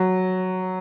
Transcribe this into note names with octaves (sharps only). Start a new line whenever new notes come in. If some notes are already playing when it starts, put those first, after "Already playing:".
Already playing: F#3